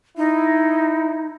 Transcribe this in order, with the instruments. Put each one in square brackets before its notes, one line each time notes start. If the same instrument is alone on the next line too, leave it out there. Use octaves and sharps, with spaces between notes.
[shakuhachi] D#4 [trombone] E4